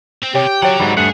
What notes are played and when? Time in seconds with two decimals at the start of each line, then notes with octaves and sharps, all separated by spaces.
0.23 C4
0.35 C3 G4 C#5
0.47 G5
0.63 F#3 C#5 D5 F#5 G5
0.80 G#2 F#3 G3
0.97 G2 A3 G#4 F#5